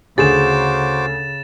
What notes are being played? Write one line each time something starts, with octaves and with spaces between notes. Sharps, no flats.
D2 C#3 F#4 G#4 C5 D6 A6 E7